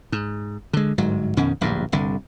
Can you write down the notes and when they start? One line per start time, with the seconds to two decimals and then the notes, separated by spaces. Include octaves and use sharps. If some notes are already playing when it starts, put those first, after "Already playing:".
0.12 G#2
0.73 D3 G#3
0.98 G1 G#2 F#3
1.37 F2 B2 D#3 C#4
1.61 D1 A#1 E2 G2
1.92 G1 C2 D3